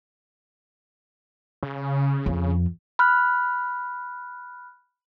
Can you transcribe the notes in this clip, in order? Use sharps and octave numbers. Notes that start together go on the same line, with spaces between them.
C#3
F2
B5 F6 F#6